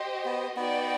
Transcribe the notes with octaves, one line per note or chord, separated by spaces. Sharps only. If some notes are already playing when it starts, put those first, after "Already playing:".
Already playing: G4 C5 D#5
B3
B3 D#4 F#4 B4 D5 G5